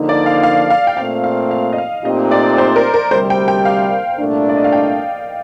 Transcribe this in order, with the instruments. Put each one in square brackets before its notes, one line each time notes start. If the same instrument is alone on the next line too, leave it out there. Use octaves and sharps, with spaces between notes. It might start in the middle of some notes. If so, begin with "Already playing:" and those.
Already playing: [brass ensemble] D3 F3 A#3 D#4
[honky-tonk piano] D5
F5
F5
F5
G5
[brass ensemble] A#2 A3 C4 [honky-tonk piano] F5
[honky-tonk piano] F5
F5
D#5
F5
[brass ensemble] A#2 A3 C4 D#4 G4 [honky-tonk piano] D#5
[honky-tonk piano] D5
C5
A#4
A#4
[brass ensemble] D2 C3 G3 [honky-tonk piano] C5
[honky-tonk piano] G5
G5
F5
[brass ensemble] C2 A#2 A3 D4
[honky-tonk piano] D5
D#5
F5
G5